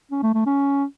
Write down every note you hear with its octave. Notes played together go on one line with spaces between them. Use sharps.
C#4
A3
A3
C#4